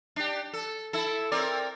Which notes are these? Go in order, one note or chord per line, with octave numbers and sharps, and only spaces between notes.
D4 G4
A4
E4 A4
C4 A#4 D5